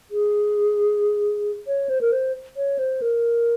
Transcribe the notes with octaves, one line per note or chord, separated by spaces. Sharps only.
G#4
C#5
C5
A#4
C5
C#5
C5
A#4